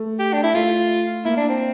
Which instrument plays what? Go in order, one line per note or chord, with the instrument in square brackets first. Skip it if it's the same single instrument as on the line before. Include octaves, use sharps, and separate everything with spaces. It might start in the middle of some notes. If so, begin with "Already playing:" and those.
Already playing: [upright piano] A3
[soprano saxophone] G4
D4
E4
[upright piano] A3 [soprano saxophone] F4
[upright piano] A#3 [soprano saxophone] E4
[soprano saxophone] D4
C4